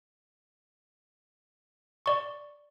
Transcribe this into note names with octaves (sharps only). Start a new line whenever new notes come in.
D5 C#6